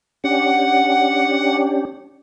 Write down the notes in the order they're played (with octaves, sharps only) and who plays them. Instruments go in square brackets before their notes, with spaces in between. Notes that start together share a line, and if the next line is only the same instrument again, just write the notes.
[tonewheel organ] C#4 D4 G4 [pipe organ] F#5